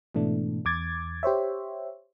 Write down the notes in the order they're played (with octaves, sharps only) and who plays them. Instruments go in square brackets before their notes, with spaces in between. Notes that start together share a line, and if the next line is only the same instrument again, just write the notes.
[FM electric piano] G#2 B2 E3 A3 D4
E2 D6 G#6 A6
G4 C5 C#5 E5